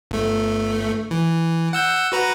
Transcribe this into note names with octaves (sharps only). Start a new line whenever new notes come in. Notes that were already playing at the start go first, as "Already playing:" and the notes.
G1 A3
E3
F#5 E6 G6
F#4 B4 A#5